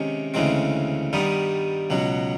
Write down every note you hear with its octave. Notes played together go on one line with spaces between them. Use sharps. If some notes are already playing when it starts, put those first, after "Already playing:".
Already playing: C3 D#3 G#3 C#4
D2 C#3 E3 G#3 C4
G2 D#3 G3 B3 D#4
C#2 B2 F#3